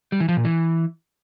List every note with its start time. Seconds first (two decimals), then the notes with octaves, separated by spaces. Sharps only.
0.12 G3
0.20 E3
0.29 F3
0.37 A#2
0.45 E3